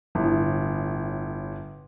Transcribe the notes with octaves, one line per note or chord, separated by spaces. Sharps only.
G1 A2